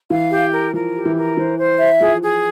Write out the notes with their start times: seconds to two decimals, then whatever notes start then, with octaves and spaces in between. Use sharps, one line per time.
0.10 E3 F5
0.31 G4
0.52 A#4
0.73 F3 A#4
0.95 G4
1.05 E3
1.16 A#4
1.37 E3 C5
1.58 C5
1.79 E5
2.01 F3 G#4
2.22 G#4